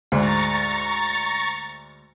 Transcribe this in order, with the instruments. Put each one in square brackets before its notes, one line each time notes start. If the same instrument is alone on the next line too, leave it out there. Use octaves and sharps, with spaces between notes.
[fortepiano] D2 G#2 [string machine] A#5 C#6 A6